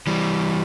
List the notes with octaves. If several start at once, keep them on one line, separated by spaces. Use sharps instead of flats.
E3 G3